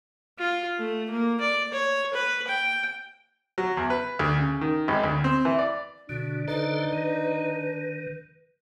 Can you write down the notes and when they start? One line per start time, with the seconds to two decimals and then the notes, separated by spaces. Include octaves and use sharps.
0.38 F4
0.78 A3
1.10 A#3
1.41 D5
1.72 C#5
2.14 B4
2.47 G5
3.58 F#3
3.77 E2
3.90 B4
4.19 D2
4.39 C#3
4.61 D#3
4.88 G#1
5.03 D2
5.24 C4
5.45 E3
5.59 D5
6.09 B2 D3 D4 F#4
6.48 D3 D#4 A4 B4 C5
6.93 D#3